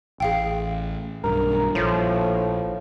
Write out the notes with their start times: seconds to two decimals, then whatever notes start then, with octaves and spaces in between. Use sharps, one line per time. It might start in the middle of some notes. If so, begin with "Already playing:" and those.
0.20 A1 G#4 F5 G5
1.24 B1 G2 A#4
1.75 A#1 A2 F3